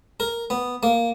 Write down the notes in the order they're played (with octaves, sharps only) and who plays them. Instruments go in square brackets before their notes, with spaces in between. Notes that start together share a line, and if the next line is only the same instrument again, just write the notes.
[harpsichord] A#4
B3
A#3